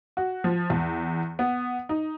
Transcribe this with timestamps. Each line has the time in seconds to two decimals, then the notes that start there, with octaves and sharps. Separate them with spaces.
0.17 F#4
0.44 F3
0.70 E2
1.39 B3
1.89 D#4